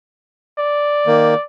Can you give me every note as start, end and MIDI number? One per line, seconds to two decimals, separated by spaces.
0.59 1.43 74
1.07 1.34 51
1.07 1.34 58